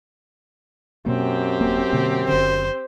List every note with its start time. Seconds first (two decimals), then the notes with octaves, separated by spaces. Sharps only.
1.06 F#2 B2 A#3 C4 G4
1.61 D#1 A#3
1.92 B2 D3 A#3
2.28 F#1 D3 C5